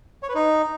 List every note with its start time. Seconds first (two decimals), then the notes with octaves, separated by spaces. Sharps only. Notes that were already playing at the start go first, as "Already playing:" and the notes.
0.23 C#5
0.29 B4
0.35 D#4